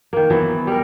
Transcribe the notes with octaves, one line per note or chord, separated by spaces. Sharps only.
D#3 A#3
E3 F#3 B3
G3 A#4